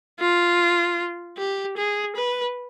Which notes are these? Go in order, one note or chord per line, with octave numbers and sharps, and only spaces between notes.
F4
G4
G#4
B4